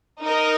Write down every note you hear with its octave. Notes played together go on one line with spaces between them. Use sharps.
D#4 A#4 D#5